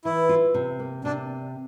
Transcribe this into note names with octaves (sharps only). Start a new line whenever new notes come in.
E3 E4
F4
C3
A#3
C3 D4